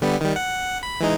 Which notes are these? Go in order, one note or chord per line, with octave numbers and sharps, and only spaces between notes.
D3 G3 B3
D#3 G3
F#5
B5
E3 G#3 D#4